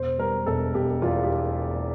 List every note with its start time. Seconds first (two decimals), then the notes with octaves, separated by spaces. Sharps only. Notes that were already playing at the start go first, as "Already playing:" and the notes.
Already playing: E1 C5
0.18 G3 A#4
0.46 E1 A4
0.74 E1 G4
1.02 E2 F4
1.23 G4